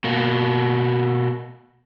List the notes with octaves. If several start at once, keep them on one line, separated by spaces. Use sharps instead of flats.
B2 A#3